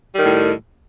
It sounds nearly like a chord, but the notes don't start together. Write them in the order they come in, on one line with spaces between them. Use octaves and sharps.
G3 D#3 A2